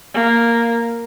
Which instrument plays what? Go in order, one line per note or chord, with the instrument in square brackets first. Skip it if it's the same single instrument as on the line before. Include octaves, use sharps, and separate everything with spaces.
[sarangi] A#3